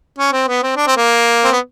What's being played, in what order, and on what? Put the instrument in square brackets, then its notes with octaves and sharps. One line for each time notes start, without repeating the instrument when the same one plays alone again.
[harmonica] C#4
C4
B3
C4
D4
C4
A#3
C4
B3